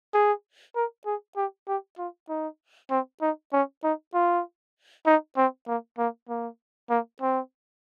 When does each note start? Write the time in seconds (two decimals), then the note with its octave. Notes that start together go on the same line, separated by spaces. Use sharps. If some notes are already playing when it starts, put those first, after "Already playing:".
0.14 G#4
0.76 A#4
1.06 G#4
1.36 G4
1.68 G4
1.98 F4
2.29 D#4
2.90 C4
3.21 D#4
3.53 C#4
3.84 D#4
4.14 F4
5.06 D#4
5.37 C4
5.67 A#3
5.98 A#3
6.29 A#3
6.90 A#3
7.21 C4